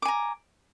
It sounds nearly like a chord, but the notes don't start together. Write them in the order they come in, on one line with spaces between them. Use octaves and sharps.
D6 G#5 A#5